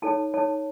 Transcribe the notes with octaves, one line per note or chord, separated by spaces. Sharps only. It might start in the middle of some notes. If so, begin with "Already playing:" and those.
D#4 A4 C#5 A5
D#4 A4 C#5 A5